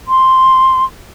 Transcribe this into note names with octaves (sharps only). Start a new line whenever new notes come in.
C6